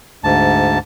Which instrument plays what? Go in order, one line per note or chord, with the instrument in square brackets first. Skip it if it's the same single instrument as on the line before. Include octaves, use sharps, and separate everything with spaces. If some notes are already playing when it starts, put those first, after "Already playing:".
[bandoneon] D2 G#2 A5